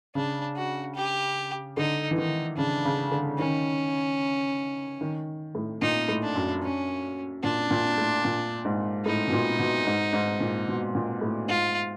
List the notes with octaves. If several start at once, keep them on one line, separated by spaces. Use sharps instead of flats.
C#3 D4
F#4
G4
D3 D#4
E3
D#3 D#4
C#3 D4
C#3
D3
D#3 C#4
D#3
A2
A#2 D#4
A2
D4
F#2
C#4
A#2 D4
A#2
A2
A#2
G#2
A2 D#4
B2
A#2
B2
G#2
G#2
A#2
B2
A#2
A2
G#2 F4